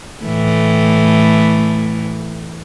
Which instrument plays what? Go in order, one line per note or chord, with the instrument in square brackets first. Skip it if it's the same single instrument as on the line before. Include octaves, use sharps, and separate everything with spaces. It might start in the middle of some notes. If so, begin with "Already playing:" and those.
[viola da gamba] A2 E3 A3